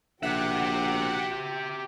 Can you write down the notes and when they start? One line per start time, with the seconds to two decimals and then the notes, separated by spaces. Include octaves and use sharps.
0.23 A#1 F#4 G4 E5 F#5 G5